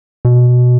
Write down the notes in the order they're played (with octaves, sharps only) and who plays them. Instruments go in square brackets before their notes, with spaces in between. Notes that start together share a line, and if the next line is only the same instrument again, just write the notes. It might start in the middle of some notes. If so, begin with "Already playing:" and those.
[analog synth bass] B2